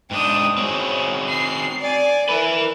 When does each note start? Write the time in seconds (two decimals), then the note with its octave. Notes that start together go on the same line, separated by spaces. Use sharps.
0.11 G#2 D4 G5 D#6
0.57 C4 F#4 G#4 C#5
1.29 C7
1.80 D5 G#5
2.29 E4 A#4 B4